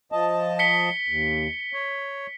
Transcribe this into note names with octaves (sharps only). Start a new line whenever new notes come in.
F3 D#5 A5
B6 C#7 G7
D#2
C#5